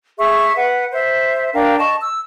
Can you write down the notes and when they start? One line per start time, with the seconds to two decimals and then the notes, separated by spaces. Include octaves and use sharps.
0.19 G#4 E5 C#6
0.56 B4 F#5
0.92 C5 E5
1.54 D4 A#4 F5 G5
1.78 D#5 A5 C#6
2.01 E6